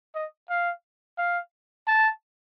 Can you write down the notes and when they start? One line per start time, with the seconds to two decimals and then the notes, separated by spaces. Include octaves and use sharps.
0.15 D#5
0.50 F5
1.18 F5
1.88 A5